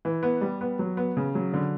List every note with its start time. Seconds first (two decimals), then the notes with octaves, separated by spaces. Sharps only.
0.05 E3
0.23 B3
0.41 G3
0.61 B3
0.79 F#3
0.97 B3
1.17 C#3
1.35 F#3
1.54 D3